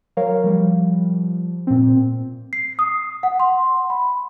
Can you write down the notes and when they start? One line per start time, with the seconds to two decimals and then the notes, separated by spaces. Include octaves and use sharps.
0.17 F#3 A#4 C#5 F5
0.44 F3 G3
1.67 A#2 C4
2.53 C7
2.79 D#6
3.23 F#5
3.40 C6
3.90 B5